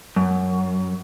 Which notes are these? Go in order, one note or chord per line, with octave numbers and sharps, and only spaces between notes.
F#2